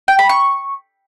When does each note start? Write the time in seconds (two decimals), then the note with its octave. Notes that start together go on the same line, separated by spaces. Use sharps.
0.08 G5
0.19 B5
0.29 C#6